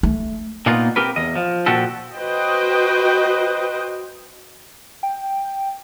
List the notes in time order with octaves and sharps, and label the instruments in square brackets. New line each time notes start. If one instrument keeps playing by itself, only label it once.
[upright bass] A3
[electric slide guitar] A#2 A#3 B3 D#4 F4
C4 G4 A#4 B4
E2 D#5
F3
A#2 F3 F#4 G4 A4
[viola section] F#4 B4 C5 D#5 G5
[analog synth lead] G5